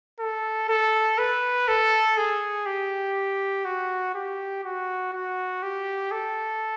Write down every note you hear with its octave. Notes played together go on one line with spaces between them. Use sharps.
A4
A4
B4
A4
G#4
G4
F#4
G4
F#4
F#4
G4
A4